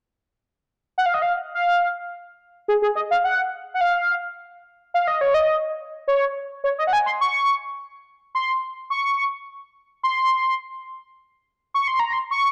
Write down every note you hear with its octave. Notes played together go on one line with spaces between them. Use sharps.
F#5
F5
D#5
F5
F5
G#4
G#4
D#5
F5
F#5
F#5
F5
F5
D#5
C#5
D#5
C#5
C#5
D#5
F#5
G#5
C6
C#6
C6
C#6
C6
C#6
C6
A#5
C6
C#6